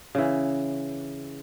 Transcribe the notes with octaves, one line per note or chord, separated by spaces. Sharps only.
C#3 E3